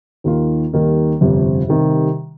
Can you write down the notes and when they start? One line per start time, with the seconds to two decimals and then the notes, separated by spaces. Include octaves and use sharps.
0.24 D#2 D#3 A#3 F4
0.73 D#2 D#3 G3 A#3 D#4
1.21 G1 F2 C3
1.68 C3 D#3 G3